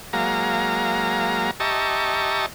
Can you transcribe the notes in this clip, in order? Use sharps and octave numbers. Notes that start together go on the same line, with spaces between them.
F#3 G#3 A#3 F5 A#5
G4 D#5 E5 A5 A#5 C#6